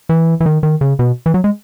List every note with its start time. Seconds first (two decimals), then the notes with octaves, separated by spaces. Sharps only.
0.09 E3
0.40 E3
0.46 D#3
0.63 D#3
0.81 C#3
0.99 B2
1.26 E3
1.34 F#3
1.44 G#3